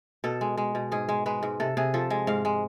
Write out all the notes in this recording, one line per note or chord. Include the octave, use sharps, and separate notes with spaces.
B2 A4
G#3
G#3
B2
G#2 G#4
G#3
G#3 B4
G#2
C3 A4
C3 G#4
F3 A4
G#3
G#2 F5
G#3